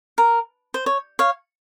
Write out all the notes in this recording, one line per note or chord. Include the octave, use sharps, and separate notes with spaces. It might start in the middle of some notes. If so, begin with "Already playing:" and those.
A#4
C5
C#5
C#5 F5